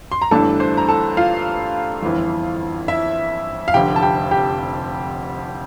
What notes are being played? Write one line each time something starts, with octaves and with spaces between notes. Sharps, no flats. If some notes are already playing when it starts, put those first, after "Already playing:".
C6
A#5
G1 G2 E3 A3 D4 A4 A5
C5 C6
A#5
A4 A5
F4 F5
G1 F2 E3
E4 E5
F5
F1 F2 D3 G4 G5
A5
G4 G5
G4 G5